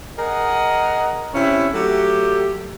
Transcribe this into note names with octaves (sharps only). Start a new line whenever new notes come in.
G#4 A#4 D#5 F#5
C3 C#4 E4
F#3 A3 G4